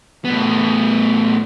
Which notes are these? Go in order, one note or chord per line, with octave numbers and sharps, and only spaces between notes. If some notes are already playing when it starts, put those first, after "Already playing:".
A2 B3